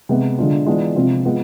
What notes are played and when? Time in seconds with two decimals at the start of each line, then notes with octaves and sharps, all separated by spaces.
0.09 C3 G#3 B3
0.38 D3 G#3 D4 F4
0.67 E3 G#3 B3 D4 F4
0.95 C3 F3 G#3 C4 F4
1.25 G#3 B3 F4